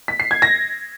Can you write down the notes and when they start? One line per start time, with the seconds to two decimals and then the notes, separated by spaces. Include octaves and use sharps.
0.08 B6
0.20 C7
0.31 G#6
0.42 A#6